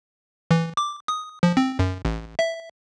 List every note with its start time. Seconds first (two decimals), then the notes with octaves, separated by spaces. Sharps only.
0.51 E3
0.77 D6
1.08 D#6
1.43 F3
1.57 C4
1.79 F#2
2.05 A1
2.39 E5